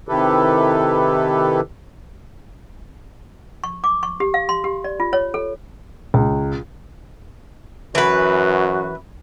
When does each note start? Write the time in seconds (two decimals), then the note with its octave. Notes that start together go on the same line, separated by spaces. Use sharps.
0.09 C3 D#3 E4 G4 A4 B4
3.64 C#6
3.84 D6
4.03 C#6
4.20 G4
4.34 F5
4.49 C6
4.64 G4
4.84 D5
5.00 F4
5.13 C#5
5.34 A4
6.14 C#2
7.95 F#2 E3 F#4 B4